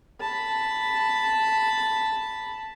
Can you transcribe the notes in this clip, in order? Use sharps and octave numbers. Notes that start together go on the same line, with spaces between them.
A5 B5